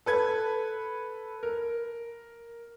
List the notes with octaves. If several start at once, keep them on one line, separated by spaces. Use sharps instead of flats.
A4 B4 G#6
A#4